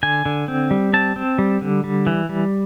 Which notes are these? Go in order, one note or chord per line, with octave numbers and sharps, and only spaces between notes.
D3 G#5
D3
C4
G3
C4 A5
C4
G3
D3
G3
E3
G3